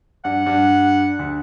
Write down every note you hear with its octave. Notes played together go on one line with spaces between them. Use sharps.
G2 F#5
G2
D2